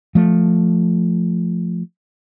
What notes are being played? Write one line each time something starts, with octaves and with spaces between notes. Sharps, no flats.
F3 A3